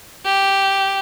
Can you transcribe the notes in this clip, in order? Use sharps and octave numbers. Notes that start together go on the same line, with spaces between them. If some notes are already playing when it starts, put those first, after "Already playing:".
G4